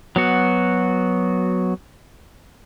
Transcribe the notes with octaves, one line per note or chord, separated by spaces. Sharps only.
F#3 B3 F#4